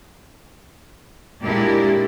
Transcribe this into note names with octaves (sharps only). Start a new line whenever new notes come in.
A#2 G#3 A#3 D4 E4 G4